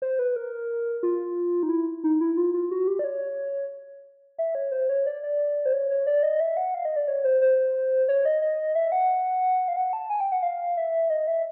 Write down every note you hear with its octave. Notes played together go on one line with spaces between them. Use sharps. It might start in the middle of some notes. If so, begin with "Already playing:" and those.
C5
B4
A#4
F4
D#4
E4
D#4
E4
F4
F4
F#4
G4
D5
C#5
E5
C#5
C5
C#5
D5
D5
C5
C#5
C#5
D5
D#5
E5
F#5
F5
D#5
D5
C#5
C5
C5
C#5
D#5
D#5
E5
F#5
F5
F#5
A5
G#5
G5
F#5
F5
E5
D#5
E5